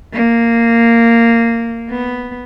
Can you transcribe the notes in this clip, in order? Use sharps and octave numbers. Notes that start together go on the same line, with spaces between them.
A#3
B3